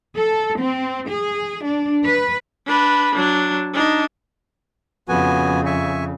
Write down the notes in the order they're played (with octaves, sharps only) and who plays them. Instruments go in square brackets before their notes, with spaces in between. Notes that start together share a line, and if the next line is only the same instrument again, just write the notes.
[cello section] A4
C4
G#4
D4
B4
[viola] D4 B4
F#3 D4
D4 D#4
[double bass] F2 C#3 [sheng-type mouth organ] B3 F#4 G#5
[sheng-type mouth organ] E5 G#5 C#6